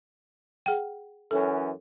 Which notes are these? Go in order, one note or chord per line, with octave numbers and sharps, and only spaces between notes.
G#4 F#5 G5
F#2 E3 C#4 A4